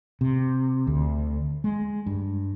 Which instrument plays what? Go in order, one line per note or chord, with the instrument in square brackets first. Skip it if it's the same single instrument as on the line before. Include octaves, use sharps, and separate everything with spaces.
[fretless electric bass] C3
D2
G#3
G2